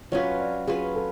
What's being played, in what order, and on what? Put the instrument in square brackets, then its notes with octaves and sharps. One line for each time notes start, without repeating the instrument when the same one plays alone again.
[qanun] F#3 C#4 F4 B4 [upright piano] C#5
[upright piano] D5
[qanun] F#3 C#4 F4 B4 [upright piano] G#4
[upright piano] A4